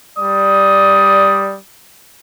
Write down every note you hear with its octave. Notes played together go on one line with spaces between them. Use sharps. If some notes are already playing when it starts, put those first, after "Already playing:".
G3 D5 D#6